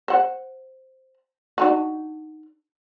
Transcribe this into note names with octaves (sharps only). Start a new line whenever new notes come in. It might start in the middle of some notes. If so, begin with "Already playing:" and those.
C5 F#5
D4 D#4 F#4